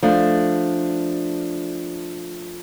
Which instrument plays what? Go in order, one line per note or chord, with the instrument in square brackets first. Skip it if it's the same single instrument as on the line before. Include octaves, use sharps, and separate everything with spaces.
[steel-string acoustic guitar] F3 A3 D4